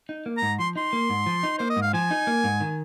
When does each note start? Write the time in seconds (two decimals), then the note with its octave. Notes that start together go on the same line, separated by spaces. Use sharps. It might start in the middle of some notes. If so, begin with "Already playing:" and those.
0.09 D#4
0.26 A#3
0.37 G#2 A#5
0.59 F3 C6
0.76 D#4 C6
0.93 A#3
1.10 G#2
1.26 F3
1.43 D#4
1.59 A#3 C5
1.70 D#5
1.77 G#2
1.82 F5
1.93 F3 G#5
2.11 D#4
2.27 A#3
2.44 G#2
2.61 D#3